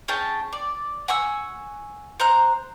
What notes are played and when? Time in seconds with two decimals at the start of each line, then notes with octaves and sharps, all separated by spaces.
0.08 C#4 G#4 G5 A5
0.53 D5
1.08 F#5 G#5 C#6 E6
2.20 C5 A#5 F#6